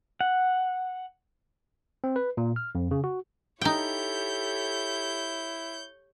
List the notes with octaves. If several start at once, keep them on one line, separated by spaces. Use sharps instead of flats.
F#5
C4
B4
A#2
F6
F2
C#3
F#4
D#4 E4 G4 A4 C#5 G5 G6